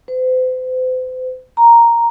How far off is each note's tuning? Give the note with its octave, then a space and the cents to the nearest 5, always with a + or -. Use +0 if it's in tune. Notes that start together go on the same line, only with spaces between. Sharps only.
C5 -40
A#5 +0